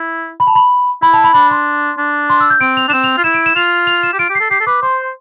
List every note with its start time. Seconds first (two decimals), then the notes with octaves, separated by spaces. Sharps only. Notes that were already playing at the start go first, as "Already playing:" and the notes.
Already playing: E4
0.40 B5
0.47 A5
0.55 B5
1.02 E4 B5
1.13 A5
1.24 B5
1.34 D4 B5
1.51 C6
1.98 D4
2.30 C6
2.40 E6
2.50 G6
2.61 C4 D7
2.77 F7
2.88 C4 D4 E7
3.04 F7
3.17 F4
3.24 E4 E7
3.34 D7
3.46 E7
3.56 F4 F7
3.87 F7
4.03 E7
4.13 G4
4.19 F4 D7
4.30 G4
4.35 C7
4.40 A4
4.51 G4 C7
4.61 A4
4.67 B4 D6
4.82 C5 C6